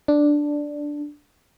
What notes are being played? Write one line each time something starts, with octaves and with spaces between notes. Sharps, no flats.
D4